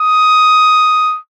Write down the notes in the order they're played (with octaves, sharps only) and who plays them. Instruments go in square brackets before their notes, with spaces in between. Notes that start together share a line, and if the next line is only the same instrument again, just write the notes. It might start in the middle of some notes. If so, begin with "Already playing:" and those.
Already playing: [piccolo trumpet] D#6